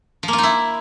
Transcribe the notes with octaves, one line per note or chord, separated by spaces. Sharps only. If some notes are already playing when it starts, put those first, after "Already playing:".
F3
A#3
F4
D#4
E4